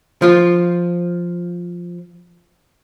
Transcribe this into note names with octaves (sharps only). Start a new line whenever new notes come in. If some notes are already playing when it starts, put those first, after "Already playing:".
F3 F4